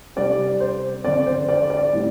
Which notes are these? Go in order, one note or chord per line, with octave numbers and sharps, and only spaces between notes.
C3 G3 C4 D5
C5
D3 C4 D5
C5
D5
D5
A2 G3 C4